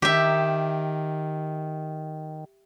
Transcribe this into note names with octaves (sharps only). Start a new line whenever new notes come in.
D#3 G4 E5